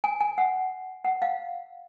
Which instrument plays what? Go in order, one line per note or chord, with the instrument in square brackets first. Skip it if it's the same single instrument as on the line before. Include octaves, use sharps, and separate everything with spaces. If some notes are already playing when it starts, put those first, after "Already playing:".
[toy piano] G#5
G#5
F#5
F#5
F5